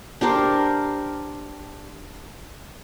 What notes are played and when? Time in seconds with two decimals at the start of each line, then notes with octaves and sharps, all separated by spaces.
0.21 D4 G4 A#4 C5